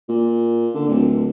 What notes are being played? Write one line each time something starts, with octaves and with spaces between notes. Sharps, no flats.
A#2
D3
D1